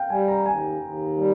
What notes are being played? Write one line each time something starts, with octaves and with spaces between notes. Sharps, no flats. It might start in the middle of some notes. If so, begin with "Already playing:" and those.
Already playing: F5 G5
G3 G#5
A#5
D#2 G#5
D#2
G3